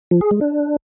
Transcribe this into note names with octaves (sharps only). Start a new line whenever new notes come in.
F3
G#4
G#3
D4